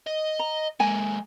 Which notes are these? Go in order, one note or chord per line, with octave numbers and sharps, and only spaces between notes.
D#5
A#5
G#3 A#3 G#5